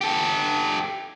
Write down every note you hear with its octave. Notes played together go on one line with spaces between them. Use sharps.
G4 A4